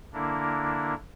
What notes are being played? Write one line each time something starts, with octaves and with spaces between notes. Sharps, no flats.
D3 A#3 D4 E4 A#4